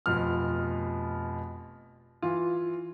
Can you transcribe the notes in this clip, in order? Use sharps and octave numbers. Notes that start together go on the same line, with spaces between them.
F1 B2 F3 F6
E3 F4